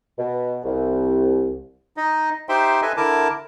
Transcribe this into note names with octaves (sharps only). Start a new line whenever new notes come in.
B2
C2
D#4 D#5
D#4 G4 C5 E5 G5 C6
A4 B4 D#5 E5 G#5
D3 E4 A#4 A5 D6